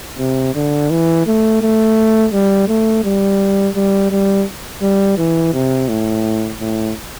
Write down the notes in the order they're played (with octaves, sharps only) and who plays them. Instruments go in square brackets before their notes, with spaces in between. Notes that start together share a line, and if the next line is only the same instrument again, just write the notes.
[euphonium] C3
D3
E3
A3
A3
G3
A3
G3
G3
G3
G3
E3
C3
A2
A2